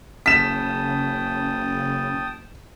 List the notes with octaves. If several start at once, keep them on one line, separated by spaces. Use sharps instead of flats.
F#1 C#3 G5 A5 D#6 B6 E7